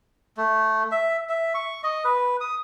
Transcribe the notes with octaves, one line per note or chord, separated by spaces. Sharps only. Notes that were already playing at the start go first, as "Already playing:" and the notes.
A3
E5
E5
C#6
D#5
B4
D#6